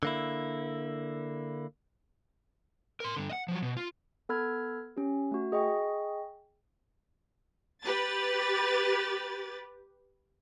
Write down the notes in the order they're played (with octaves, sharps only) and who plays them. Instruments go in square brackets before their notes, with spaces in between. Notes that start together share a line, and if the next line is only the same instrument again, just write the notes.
[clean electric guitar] D3 A#3 E4
[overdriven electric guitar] A#4 C6
G2 D3
D#5 F#5
F3 F#3
B2
F4
[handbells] B3 A4 B5 F6 G#6
C#4 G4
A3 F#4
G#4 D#5 G5 C#6
[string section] G4 B4 A6